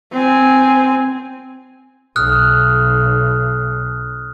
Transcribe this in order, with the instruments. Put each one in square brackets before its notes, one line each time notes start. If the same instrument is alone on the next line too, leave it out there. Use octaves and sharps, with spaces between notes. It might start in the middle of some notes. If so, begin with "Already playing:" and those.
[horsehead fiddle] C4 G#5
[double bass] B1 [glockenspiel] D#6 F6 F#6